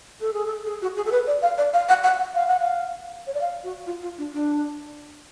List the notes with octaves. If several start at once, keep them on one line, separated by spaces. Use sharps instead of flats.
A4
G#4
A4
G#4
F#4
G#4
A4
B4
D5
F5
D5
F5
F#5
F#5
F#5
F5
F#5
F5
C#5
D5
F5
F#4
F4
F4
D4
D4